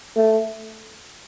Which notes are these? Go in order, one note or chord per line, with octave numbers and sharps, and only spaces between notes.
A3